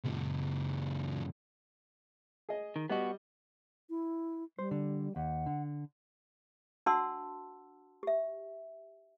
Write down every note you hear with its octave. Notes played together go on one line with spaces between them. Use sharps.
C#2 F#2
G#4 D#5
D#3
G3 B3 F#4 D#5
E4
G3 C5
D3
D#2 F#5
D3
D4 F#4 F#5 A5 C6 E6
G4 E5